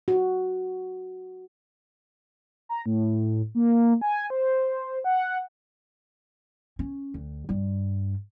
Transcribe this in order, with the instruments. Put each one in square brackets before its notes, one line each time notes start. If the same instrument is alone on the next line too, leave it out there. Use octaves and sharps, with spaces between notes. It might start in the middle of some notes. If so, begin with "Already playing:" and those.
[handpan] F#4
[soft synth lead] A#5
A2
A#3
G#5
C5
F#5
[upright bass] C#4
D2
G2 G3